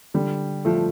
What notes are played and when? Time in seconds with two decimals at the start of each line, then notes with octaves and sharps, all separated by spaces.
0.14 D3 G3
0.65 F3 A3